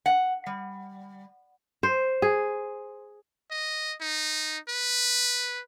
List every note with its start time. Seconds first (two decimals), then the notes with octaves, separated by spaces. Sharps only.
0.06 F#5
0.46 G3
1.83 C5
2.22 G#4
3.51 D#5
4.01 D#4
4.69 B4